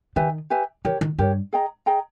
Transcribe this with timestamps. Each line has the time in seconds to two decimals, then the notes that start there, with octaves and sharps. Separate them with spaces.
0.16 D#3 G4 B4 E5 G#5
0.50 G4 B4 E5 G#5
0.85 E3 G4 A#4 C#5
1.01 D#3
1.18 G2 G4 A#4 C#5
1.53 G#4 D#5 G5 A#5
1.86 G#4 D#5 G5 A#5